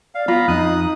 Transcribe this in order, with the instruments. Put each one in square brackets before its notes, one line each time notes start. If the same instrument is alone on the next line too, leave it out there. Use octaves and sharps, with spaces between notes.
[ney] D5 [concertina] F5
[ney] B3 [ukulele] F4 [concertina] F5 A#5 B5
[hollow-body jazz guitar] F2 [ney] D#4 [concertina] D#6 F#6